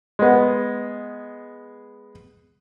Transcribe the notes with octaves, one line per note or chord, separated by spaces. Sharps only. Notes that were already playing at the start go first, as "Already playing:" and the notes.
G#3 B3